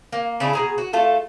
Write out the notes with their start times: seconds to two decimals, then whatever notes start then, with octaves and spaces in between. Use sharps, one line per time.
0.13 A#3
0.40 C#3 D4 E4 G#4
0.53 B2 G#4 A#5
0.78 F#4
0.93 A3 F4 A4